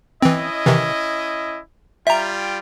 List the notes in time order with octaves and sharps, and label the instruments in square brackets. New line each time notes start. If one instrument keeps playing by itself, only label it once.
[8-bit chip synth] E3 C4 [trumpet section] C#4 E4 D#5
[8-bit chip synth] C3 D#3 E3
[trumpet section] G3 F4 G5 [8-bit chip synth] E5 A#5